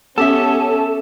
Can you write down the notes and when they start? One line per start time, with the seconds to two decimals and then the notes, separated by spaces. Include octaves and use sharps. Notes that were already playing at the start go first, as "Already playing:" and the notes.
0.18 B3 C#4 G4 A4 E5